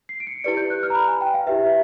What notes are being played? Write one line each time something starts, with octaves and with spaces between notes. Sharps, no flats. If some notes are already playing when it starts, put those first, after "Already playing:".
C7
D7
C#7
E4 G4 B4 D5 C#7
G6
F#6
F6
A#5
B5
G#5
G5
F5
E4 G4 B4 E5
E5